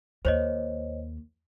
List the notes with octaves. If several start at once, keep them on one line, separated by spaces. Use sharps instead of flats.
D#2 C5 C#5 D#5